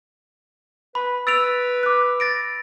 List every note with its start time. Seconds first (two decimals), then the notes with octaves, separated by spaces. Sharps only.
0.95 B4 B5
1.27 B4 E6 A6 D7 F7
1.83 D6 F#6
2.20 A6 A#6 D7